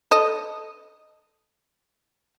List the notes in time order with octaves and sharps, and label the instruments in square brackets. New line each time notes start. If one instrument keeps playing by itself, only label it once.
[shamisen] A4 D#5